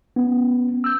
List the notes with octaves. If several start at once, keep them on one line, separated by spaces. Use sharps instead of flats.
B3 C#4
E6 G6